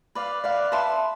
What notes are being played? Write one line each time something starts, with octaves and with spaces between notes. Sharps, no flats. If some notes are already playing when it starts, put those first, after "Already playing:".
B4 D5 F5
B4 D5 F5
B4 E5 A5 C6